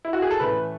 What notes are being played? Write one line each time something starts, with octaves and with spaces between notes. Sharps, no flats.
E4
F#4
G#4
A4
A2 E3 A3 C#4 B4